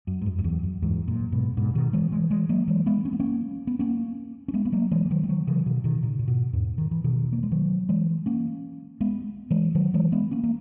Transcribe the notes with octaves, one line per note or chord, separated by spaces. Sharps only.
F#2
G#2
F#2
F#2
E2
F#2
E2 G#2
F#2 A#2
G#2 B2
G#2 B2
B2 D#3
E3 G#3
E3 G#3
E3 G#3
F#3 A#3
E3 G#3
G#3 B3
C#4
B3
A#3 C#4
B3
A#3 C#4
C#4
G#3 B3
B3
F#3 A#3
E3 G#3
E3
D#3 F#3
G#3
D#3 F#3
C#3 E3
B2 D#3
B2 D#3
A#2 C#3
A#2
G#2 B2
E2 G#2
D#3
E3
B2 D#3
A#3
G#3
D#3 F#3
E3 G#3
A#3 C#4
G#3 B3
E3 G#3
D#3 F#3
E3 G#3
G#3 B3
A#3 C#4
A#3